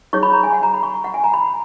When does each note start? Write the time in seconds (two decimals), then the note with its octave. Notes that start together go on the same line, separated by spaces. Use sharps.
0.13 D#4 G#4 C#5 C#6
0.23 B5
0.33 A#5
0.43 G#5
0.53 F#5
0.63 A#5
0.74 B5
0.83 C#6
1.04 F#5
1.14 G#5
1.24 A#5
1.34 B5